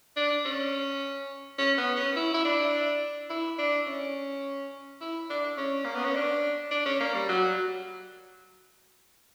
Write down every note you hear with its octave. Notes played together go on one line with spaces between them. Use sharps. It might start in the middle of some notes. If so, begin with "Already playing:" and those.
D4
C#4
C#4
B3
C#4
E4
E4
D4
E4
D4
C#4
E4
D4
C#4
A#3
B3
C#4
D4
D4
C#4
A#3
G3
F#3